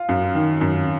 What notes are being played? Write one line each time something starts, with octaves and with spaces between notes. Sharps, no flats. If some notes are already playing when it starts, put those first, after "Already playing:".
Already playing: F4
F#2
D#3
F#2